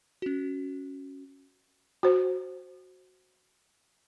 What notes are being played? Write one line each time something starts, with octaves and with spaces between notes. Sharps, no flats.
C#4 F#4
F#4 C5